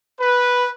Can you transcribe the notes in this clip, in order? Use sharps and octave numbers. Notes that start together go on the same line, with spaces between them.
B4